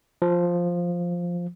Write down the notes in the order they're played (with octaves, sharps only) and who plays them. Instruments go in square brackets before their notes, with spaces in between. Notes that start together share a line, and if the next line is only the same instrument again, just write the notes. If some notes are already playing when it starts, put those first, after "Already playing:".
[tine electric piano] F3